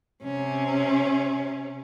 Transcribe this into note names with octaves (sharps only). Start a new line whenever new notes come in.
C3 C#4